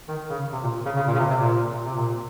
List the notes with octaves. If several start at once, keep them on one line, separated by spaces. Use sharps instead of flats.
D#3
C#3
C3
A#2
C#3
C#3
A#2
C#3
C3
C3
A#2
C3
A#2